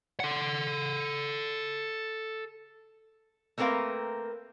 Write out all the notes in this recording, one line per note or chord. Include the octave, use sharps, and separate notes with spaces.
A4 F#5
A3 A#3 C4 A#4 B4 F5